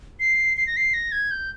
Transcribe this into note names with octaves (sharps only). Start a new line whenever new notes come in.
C7
C7
A#6
C7
A#6
G#6
G6